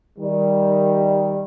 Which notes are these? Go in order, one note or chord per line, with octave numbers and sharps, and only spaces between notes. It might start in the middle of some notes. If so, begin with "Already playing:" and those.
D#3 G3